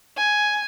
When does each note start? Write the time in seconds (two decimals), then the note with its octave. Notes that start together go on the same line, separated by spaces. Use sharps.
0.17 G#5